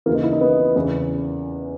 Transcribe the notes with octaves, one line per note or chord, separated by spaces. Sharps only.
D#2 C#3 E3 A#3
D#4
E4
D#4
B3
E2 C#3 E3